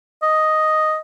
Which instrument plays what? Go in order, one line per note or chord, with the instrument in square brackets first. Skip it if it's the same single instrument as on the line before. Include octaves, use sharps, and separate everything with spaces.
[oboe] D#5